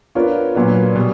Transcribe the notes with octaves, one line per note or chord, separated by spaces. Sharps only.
B3 D4 F4 A#4 C#5
A#2 F#3 B3 D4
B2 G3